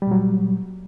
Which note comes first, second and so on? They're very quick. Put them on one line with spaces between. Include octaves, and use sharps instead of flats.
G3 A#2 F#3